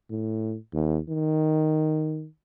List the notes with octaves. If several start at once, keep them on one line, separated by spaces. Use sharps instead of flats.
A2
D#2
D#3